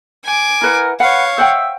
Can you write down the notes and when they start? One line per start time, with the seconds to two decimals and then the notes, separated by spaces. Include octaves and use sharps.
0.24 G#5 D6
0.62 E4 A#4 B4 F#5
1.00 B4 C#5 F5 F#5
1.38 C5 E5 F#5 G5